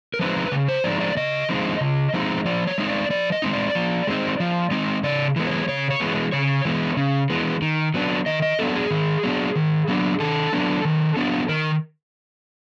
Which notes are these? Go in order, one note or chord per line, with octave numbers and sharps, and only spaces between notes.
A#4
F3 G#3 C4 D#4 B4
C#3
C5
F3 G#3 C4 D#4 D5
D5
C#3 D#5
F3 G#3 C4 D#4
C#3
F3 G#3 C4 D#4
F3 D5
C#5
G#3 C4 D#4
D5
F3 D5
D#5
G#3 C4 D#4
D5
F3
G#3 C4 D#4
F3
G#3 C4 D#4
C#3 D5
E3 G#3 B3
C#5
C#3 C#5
C#5
E3 G#3 B3
C#3 C#5
E3 G#3 B3
C#3
E3 G#3 B3
D#3
F#3 B3 D4
D#3 D#5
D#5
F#3 B3 D4 A4
G#4
D#3
F#3 B3 D4
D#3
F#3 B3 D4
D#3 A4
F#3 B3 D4
D#3
F#3 B3 D4
D#3 A#4